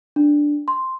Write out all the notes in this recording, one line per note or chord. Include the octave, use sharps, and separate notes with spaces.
D4
C6